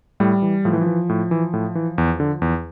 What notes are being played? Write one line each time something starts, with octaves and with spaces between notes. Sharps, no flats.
A2 G3
E3
A2 F3
E3
F3
E3
A2
E3
A2
E3
E2
D3
E2